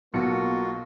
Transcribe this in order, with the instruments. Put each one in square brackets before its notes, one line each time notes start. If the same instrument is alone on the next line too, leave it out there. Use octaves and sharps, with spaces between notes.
[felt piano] B1 [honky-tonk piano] B2 C#7 [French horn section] A#3 [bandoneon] F4 F#4